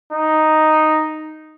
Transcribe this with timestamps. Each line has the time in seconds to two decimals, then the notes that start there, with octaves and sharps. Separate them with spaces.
0.13 D#4